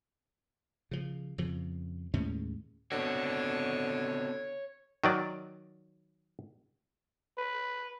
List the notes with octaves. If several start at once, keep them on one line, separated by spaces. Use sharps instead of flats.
C#3 F3
F2 C#3 F3
D#2 A2 G#3 C#4
D3 B3 C4 F#4 C#5
D#3 F#3 D5
B4